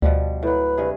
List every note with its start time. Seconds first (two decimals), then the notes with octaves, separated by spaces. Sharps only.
0.02 D2 B2 F3 G3
0.43 A2 F#3 B4
0.77 G2 C3 G#4